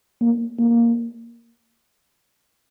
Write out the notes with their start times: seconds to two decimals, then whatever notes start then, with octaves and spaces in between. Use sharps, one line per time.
0.22 A#3
0.59 A#3